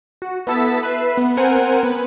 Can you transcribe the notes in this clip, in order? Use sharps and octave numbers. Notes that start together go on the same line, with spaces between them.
F#4
B3 E4 A4 E6 A6 B6
B4 E5 C7
B3
C4 A#4 C5 F#5 G#5
B3 B4